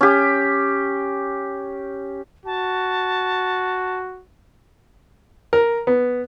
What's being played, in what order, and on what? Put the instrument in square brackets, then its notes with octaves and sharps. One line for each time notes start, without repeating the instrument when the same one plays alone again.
[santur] C#4 G4
[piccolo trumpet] F#4 [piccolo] A5
[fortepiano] A#4
B3